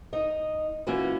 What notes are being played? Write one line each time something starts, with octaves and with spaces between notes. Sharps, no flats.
D#4 D#5
E3 A#3 B3 C#4 F4 F#4